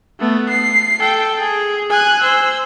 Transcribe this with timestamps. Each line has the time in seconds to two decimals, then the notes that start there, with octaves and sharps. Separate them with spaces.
0.19 A3 B3
0.49 C7
1.00 A4 G5
1.40 G#4
1.90 G#5 F#6
2.21 C5 E6